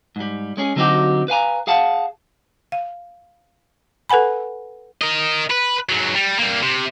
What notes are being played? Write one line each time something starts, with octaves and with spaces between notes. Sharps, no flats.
G#2 G3
G#3 C#4 G#4
D3 F#3 C4 D#4 F#4 G4
B4 F5 G#5 A#5
G#4 F5 F#5 A5
F5
A4 B4 F#5 G#5 B5
A#4 D#5
B4
G#2 F#3
G3
G3 A#3
C3